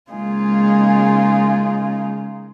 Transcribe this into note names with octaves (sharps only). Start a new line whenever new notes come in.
C#3 G#3 A#3 D#4 F4 G#4